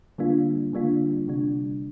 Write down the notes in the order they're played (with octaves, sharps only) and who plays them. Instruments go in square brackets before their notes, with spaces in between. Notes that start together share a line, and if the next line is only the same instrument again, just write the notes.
[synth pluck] D3 G3 A#3 D4 F4
D3 G3 A#3 D4 F4
C3 G3 D4